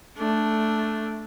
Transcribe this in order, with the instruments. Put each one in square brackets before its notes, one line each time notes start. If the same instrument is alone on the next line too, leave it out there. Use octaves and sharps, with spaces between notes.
[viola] A3 D4